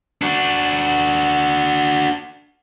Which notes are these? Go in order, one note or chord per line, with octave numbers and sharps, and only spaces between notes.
D4 F#4